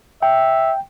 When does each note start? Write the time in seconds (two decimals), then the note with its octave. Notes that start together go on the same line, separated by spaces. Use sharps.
0.23 E5 G5